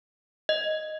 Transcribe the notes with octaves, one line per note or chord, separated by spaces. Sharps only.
D#5